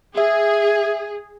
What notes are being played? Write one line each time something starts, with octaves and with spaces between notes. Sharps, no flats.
G#4 E5